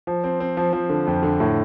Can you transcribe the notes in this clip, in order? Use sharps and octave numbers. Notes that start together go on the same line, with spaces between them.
F3
C4
C4
F3
F3
D3
F2
D3
A2